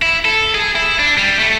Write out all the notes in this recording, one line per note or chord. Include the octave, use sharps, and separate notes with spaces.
E4
A4
G#4
E4
D4
G3
A3